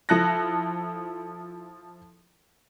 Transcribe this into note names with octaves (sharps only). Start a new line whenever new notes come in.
F3 E4 A4 F#6 A#6